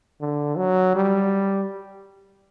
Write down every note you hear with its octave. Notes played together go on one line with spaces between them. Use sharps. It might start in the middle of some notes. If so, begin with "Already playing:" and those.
D3
F#3
G3